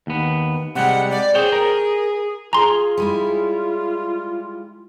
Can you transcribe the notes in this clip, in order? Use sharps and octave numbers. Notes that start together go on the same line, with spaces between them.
D#2 B3
C3 G3 G#3 F#5
D5
G#4 C5 C#5 G5
A#4
F4 G#4 G#5 A#5 C6
G3 G#3 E4